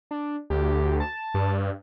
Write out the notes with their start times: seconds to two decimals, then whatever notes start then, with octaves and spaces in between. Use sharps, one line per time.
0.11 D4
0.50 D2 G4
1.00 A5
1.34 G2